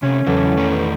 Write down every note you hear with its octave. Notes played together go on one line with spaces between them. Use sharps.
C3 A3 C#4
E2 C#3 E3 F#3 A4
D#3 A3 B4